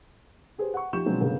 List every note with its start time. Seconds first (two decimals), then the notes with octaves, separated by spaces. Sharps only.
0.58 G4 G#4 B4 C5
0.74 F#5 C#6
0.93 F3 D#4 G4 C#6 G6 E7
1.06 B2 D3 F3 F#3 G#3 C4
1.21 G1 C#3 A#3 G#4